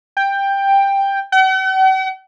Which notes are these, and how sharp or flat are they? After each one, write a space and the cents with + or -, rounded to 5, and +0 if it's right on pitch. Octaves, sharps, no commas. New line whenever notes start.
G5 +10
F#5 +45